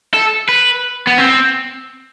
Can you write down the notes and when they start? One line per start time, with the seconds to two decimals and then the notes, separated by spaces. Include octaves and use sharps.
0.14 A4
0.49 B4
1.07 B3
1.18 C4